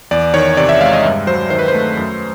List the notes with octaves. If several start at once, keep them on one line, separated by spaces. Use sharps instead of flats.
E2 D5
D#3 C#5
C3 D5
E5
G#3 F5
D#5
G2
F#3 C5
D#3 C5
B4
C5
A3
F#2